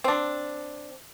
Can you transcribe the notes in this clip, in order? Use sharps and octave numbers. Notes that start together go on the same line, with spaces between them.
C4 D4